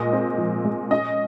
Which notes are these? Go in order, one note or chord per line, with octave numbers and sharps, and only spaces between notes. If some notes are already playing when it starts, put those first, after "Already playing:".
Already playing: A#2 G#3 D#5
C4
F3
G#3
C#4 D#5